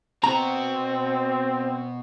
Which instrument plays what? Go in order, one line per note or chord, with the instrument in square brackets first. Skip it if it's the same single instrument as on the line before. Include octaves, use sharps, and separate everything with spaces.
[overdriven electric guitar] B2 F#4 [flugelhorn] C4 [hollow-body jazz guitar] A#5